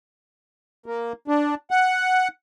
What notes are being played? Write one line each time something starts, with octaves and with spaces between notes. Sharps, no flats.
A#3
D4
F#5